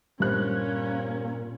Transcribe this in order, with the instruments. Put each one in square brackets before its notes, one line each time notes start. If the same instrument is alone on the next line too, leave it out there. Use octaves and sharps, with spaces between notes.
[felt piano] G2 C5 F#6 [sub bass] A#2 [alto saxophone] A#3 [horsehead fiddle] C#4